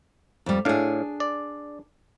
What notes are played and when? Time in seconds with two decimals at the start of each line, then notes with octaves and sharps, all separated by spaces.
0.46 F2 G3
0.65 A2 D4 G#4 F5
1.20 D5